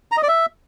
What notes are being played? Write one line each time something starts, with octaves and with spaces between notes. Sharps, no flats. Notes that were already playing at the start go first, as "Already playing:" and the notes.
A#5
D#5
D5
E5